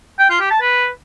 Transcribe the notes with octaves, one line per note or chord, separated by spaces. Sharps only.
G5
F4
G4
A5
B4